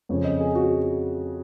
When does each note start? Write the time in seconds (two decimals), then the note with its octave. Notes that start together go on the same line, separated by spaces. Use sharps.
0.09 F2 C#3 F3 C#5
0.24 D#5
0.40 G#4
0.55 F#4